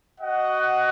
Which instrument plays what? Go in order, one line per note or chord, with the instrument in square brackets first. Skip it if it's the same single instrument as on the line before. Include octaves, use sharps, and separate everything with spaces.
[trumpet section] F#4 D#5 F#5